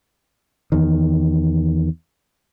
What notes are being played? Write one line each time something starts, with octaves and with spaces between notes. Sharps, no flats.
E2 D#3